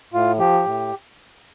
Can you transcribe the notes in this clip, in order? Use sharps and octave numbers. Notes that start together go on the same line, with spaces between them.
A2 F4
F3 G4
A2